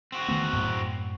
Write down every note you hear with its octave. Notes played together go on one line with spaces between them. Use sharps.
C4 F#4
D#3 A3 B3
F#2 A2